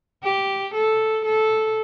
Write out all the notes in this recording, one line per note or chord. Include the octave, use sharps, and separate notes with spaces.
G4
A4
A4